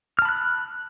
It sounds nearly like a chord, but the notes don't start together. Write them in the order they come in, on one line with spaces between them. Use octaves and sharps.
F6 A5 B5 F#6